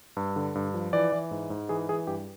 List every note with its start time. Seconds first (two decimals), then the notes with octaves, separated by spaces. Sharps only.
0.17 G2
0.36 D3
0.55 G2
0.74 F3
0.93 E3 D5
1.12 E3
1.31 G#2
1.50 G#2
1.69 E3 G#4
1.89 E3 G#4
2.07 G2 G4